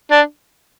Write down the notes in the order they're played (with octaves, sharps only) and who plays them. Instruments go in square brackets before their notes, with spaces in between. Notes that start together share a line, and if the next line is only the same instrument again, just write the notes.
[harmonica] D4